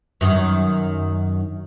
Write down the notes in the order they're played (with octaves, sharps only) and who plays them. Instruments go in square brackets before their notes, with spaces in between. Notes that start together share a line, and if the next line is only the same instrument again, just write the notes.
[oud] F#2 D#3